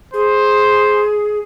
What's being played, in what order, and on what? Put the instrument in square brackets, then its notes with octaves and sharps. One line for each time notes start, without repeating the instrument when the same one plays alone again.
[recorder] G#4 [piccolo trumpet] C5